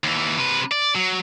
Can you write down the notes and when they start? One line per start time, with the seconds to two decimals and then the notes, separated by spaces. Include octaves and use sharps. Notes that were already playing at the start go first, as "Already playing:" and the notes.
0.04 D#2 E3
0.38 C3 B4
0.71 D5
0.95 F#3